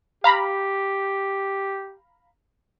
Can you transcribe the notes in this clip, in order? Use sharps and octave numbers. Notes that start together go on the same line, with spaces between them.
G4 F5 A#5 B5